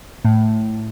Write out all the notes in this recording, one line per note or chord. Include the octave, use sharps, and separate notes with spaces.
A2